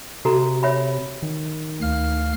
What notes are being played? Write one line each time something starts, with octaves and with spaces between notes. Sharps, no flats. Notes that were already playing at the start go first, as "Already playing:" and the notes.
C3 F#4 A4 A#5
C#5 E5 B5
D#3
D2 F5 F6